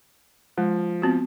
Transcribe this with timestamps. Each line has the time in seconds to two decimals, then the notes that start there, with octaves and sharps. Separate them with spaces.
0.58 F3 G#3
1.02 B3 C4 F#4